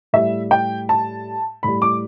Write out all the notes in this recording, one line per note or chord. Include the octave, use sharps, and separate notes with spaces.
A2 G3 E5
G5
A5
A2 G3 B5
D6